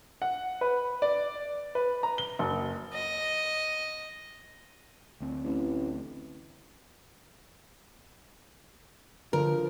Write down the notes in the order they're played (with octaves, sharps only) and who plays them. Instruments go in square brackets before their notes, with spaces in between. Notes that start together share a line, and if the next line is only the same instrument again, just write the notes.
[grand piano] F#5
B4
D5
B4
A#5
G7
F#1
[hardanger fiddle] D#5
[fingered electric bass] D2 C4
[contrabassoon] A1
[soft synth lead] D3 [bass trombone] F3 [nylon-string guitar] A#4